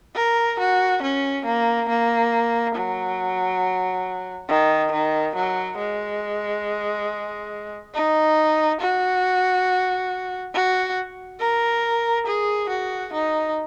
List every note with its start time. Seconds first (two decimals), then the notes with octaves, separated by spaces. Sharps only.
0.16 A#4
0.59 F#4
1.02 C#4
1.46 A#3
1.89 A#3
2.75 F#3
4.49 D#3
4.92 D#3
5.36 F#3
5.79 G#3
7.94 D#4
8.81 F#4
10.54 F#4
11.40 A#4
12.27 G#4
12.70 F#4
13.13 D#4